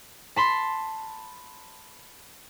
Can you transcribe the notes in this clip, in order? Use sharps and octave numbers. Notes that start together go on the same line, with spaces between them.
A5 B5 C6